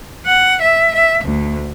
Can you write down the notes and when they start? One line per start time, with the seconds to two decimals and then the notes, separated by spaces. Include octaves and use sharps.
0.26 F#5
0.61 E5
0.94 E5
1.24 D2